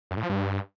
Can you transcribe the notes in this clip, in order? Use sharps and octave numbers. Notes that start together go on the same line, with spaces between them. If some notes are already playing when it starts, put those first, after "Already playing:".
F#2
A2
F3
G2